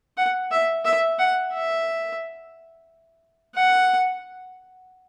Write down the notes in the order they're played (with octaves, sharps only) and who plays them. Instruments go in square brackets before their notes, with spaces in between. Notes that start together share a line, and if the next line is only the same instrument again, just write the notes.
[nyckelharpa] F#5
E5
E5
F#5
E5
F#5